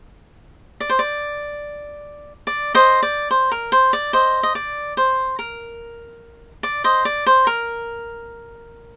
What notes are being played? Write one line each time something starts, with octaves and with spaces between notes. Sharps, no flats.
D5
C5
D5
D5
C5 D#5
D5
C5
A#4
C5
D5
C5 D#5
D#5
D5
C5
A#4
D5
C5 D#5
D5
C5
A#4